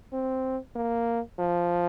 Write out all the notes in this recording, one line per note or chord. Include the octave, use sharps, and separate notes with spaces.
C4
A#3
F3